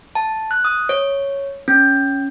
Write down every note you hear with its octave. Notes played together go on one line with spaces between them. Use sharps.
A5
F#6
D#6
C#5
C#4